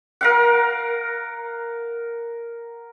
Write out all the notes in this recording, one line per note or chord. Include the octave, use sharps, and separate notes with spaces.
A#4 F5 F#5